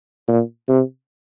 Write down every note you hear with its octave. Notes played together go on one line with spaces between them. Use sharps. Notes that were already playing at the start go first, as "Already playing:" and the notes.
A#2
C3